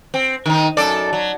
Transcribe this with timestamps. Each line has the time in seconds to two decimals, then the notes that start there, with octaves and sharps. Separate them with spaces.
0.14 C4
0.46 D#3 D#4
0.77 F#2 A4 D5
1.13 F#3